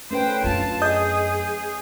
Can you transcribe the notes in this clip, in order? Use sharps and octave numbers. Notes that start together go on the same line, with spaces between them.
A3 C#4 B4 C5 G5
F#2 D4 F4 A5
G#4 D#5 D#6 G6